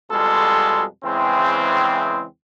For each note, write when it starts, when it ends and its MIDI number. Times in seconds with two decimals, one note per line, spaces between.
0.11 0.83 41
0.11 0.83 47
0.11 0.83 55
0.11 0.83 56
0.11 0.83 65
0.11 0.83 69
1.04 2.23 40
1.04 2.23 49
1.04 2.23 52
1.04 2.23 56
1.04 2.23 60